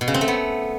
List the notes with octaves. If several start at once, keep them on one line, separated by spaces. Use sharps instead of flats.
B2
C#3
C4
A3
B3